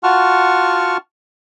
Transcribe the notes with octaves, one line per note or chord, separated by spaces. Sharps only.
F4 F#4 F#5 A5 C#6 F6